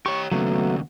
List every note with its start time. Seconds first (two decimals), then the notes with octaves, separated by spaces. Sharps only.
0.06 G4 C#5 C#6
0.32 D#2 C#3 F#3 A3 B3